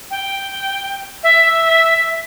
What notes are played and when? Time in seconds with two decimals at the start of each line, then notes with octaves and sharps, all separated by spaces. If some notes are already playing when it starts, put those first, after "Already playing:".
0.10 G5
1.23 E5